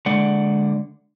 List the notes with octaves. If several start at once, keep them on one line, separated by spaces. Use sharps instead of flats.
D3 G#3 D5 F#5